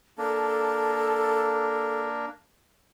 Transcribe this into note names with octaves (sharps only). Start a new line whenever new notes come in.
A#3 D4 A4